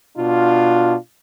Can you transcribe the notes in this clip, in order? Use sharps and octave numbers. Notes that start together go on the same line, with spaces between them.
B2 D4 F4